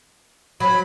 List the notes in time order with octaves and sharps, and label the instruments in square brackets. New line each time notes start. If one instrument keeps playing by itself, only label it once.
[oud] F#3 [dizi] B5